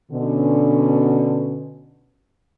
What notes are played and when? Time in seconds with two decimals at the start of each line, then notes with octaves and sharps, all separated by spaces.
0.12 B2 D3 C#4